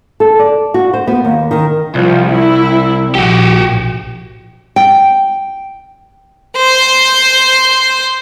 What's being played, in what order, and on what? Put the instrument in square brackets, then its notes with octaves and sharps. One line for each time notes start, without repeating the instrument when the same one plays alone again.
[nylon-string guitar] A4
D5
F#4
C5
B3
D#2
D#3
[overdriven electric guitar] C2 [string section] F3
[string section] E4
[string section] A#1 [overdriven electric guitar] F#4 G4
[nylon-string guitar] G5
[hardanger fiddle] C5 C6